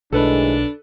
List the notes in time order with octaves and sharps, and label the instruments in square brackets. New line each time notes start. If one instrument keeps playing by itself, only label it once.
[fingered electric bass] B1 [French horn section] A2 D#3 G#3 [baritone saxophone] D4 [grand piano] A4 B4